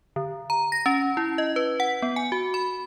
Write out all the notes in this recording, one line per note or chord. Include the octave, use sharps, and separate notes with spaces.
D3
A#5
A#6
C#4
E4
D#5
B4
F#5
B3
G#5
F#4
B5